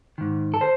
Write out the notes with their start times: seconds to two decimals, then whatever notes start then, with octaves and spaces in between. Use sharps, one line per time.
0.18 G#2 D#3
0.54 A4
0.61 C5